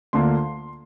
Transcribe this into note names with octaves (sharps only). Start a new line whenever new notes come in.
D2 D3 A#3 F4 C6